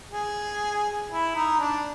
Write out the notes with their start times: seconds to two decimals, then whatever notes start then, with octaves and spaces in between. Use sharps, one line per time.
0.11 G#4
1.10 E4
1.35 D#4
1.60 D4